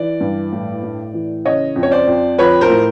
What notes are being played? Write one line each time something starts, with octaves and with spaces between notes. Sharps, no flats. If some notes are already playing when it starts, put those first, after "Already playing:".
Already playing: E3 D5
G2
A2
A2
E3
C#3 C#5 D#5
F2
C#5
C5 D5
F2
F3 B4 C#5
A#4 C5
A2